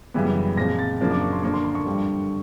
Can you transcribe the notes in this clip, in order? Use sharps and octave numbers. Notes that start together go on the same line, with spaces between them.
F#2 C#3 E3 G3 B3
A#2 F3 G#3 C4 A#6
A6
F#2 C#3 F3 A#3 D4
D6
C#6
C6
D3 F3 A#3 D4 C#6
C6
C6
C#6
G2 D3 G3